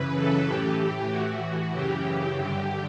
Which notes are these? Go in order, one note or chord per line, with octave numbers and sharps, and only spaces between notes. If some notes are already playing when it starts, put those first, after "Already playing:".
Already playing: F#2 C#3 E3 B4
A4
A2 E3 G4
A2 E3 F#4
F#2 C#3 E3 G4
G2 D3